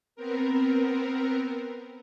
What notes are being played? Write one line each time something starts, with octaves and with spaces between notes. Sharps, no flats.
B3 C4 A#4